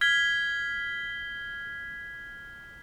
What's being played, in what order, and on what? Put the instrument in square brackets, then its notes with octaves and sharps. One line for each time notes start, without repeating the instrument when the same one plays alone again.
[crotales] F6 G#6 B6 G7